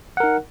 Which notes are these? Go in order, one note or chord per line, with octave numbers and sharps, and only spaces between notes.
D#4 A#4 F#5